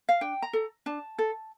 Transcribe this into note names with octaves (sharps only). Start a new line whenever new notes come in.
F5
D4 G5
A#5
A4
D4 A5
A4